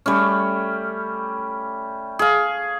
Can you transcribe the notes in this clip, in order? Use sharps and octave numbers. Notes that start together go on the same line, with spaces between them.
G3 A3 C#4
G#4 F5